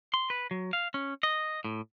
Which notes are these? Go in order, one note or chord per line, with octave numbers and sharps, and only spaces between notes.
C6
B4
F#3
F5
C#4
D#5
A2